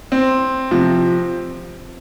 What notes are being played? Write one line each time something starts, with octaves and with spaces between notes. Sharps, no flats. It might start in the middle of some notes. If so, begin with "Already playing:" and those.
C4
C3 F3